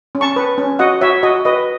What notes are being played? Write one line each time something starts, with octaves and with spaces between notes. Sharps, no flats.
C#4
A5 C#6
B4
C#4
F#4 D#5 F#5
F#4 C#5 E5
F#4 D#5
B4 D#5